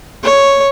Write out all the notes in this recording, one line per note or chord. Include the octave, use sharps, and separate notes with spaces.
C#5